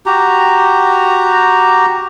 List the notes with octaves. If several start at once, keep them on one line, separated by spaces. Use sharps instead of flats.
F#4 G4 A#5